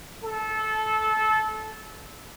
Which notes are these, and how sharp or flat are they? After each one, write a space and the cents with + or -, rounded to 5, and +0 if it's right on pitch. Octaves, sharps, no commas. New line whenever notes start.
A4 -20